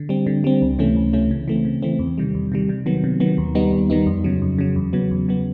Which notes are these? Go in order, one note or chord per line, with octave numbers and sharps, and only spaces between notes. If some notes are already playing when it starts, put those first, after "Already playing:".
Already playing: D3
G3 C4
D3
G3 C4
C#2
C3 E3 A3 C#4
C#2
C3 E3 A3 C#4
C#3
E3 A3 C4
C#3
E3 A3 C4
E2
C3 D#3 G3
E2
C3 D#3 G3
C3
D#3 F#3 B3
C3
D#3 F#3 B3
D#2
D#3 G3 B3 D#4
D#2
D#3 G3 B3 D#4
F2
C#3 F#3
F2
C#3 F#3
E2
C#3 F#3 B3
E2
C#3 F#3 B3